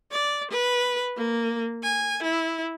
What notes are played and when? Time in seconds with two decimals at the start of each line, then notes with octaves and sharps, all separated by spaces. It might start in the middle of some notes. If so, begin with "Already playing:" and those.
0.11 D5
0.51 B4
1.17 A#3
1.83 G#5
2.23 E4